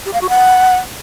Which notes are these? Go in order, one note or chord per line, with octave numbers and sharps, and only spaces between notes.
G4
F5
F#4
F#5